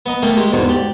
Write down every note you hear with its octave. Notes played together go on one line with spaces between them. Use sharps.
B3 D#5 A#5
A3 A#3 G5
G#3 G4
E2 G#2 B2 D3
G4 D5